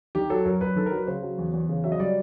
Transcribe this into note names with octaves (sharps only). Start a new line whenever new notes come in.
D#3 G4
F#3 A4
F#2 A#4
F#2 B4
D#3 A4
A#4
F#3
B4
C#3 C5
F#3
E2
E2
C#3
F#3 E5
D#5
G3 D5